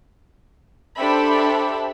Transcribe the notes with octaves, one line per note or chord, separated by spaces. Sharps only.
D4 G4 A4 C5 E5 B5